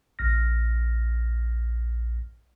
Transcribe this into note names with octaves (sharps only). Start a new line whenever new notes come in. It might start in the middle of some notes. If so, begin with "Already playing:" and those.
A#1 F6 A#6